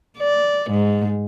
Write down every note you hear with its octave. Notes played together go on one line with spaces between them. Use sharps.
D5
G#2